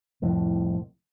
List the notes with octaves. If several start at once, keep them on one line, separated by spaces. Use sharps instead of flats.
C2 F2 A2